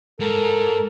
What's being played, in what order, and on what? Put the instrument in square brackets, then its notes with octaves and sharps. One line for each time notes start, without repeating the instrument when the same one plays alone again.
[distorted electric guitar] G#2 [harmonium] A4 A#4